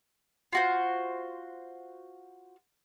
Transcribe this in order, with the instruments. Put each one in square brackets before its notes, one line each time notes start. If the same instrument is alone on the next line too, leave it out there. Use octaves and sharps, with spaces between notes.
[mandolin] F4 F#4 C5